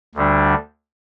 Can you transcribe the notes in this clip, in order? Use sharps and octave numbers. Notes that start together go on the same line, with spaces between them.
D2 D3 G3 D4